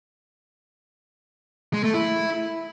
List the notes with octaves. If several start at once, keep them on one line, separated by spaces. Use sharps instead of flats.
G#3
A3
E4